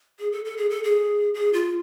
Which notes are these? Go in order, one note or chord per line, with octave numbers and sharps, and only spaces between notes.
G#4
A4
A4
G#4
A4
G#4
G#4
F4